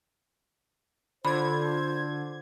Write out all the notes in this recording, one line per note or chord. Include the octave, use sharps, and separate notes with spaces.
D3 F4 C5 B5 G#6